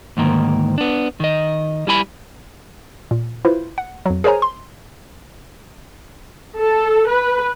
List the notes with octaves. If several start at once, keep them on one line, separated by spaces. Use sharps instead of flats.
D2 G#2 D#3 A#3
B3 D4
D#3 D#5
G3 E4 G#5 B5
A#2
E4 F4 B4 C5
F#5
F2 F#3
G#4 A#4 C5 C#5 G#5 A#5
C6
A4
B4